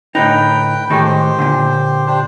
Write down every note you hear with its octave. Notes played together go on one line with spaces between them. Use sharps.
A2 D3 D#4 B4 G5
A2 D#3 G#3 A3 D#4 G4
G4 C5
A#2 D3
D4 G4 C5